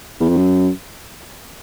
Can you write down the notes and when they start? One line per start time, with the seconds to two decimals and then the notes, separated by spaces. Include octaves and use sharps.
0.20 E2
0.29 F2
0.37 F#2